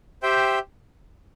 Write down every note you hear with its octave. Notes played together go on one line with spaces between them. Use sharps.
G4 C5 E5 G5